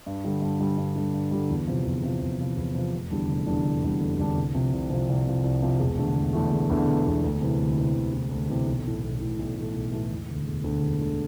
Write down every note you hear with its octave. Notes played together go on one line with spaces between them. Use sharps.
G2
D3 G3
G2
D3 G3
G2
D3 G3
G2
D3 G3
E2
C3 F3
E2
C3 F3
E2
C3 F3
E2
C3 F3
F1
E2 D3 G3 D4
F1
E2 D3 G3 D4
F1
E2 D3 G3 D4
F1
E2 D3 G3 D4
C2
C3 F3
C2
C3 F3
C2
C3 F3
C2
C3 F3
E1
E2 D3 A3
E1
E2 D3 A3
E1
E2 D3 A3
E1
E2 D3 A3
D2
C3 E3
D2
C3 E3
D2
C3 E3
D2
C3 E3
B1
A2 E3 A3
B1
A2 E3 A3
B1
A2 E3 A3
B1
A2 E3 A3
E1
D2 D3
E1
D2 D3
E1
D2 D3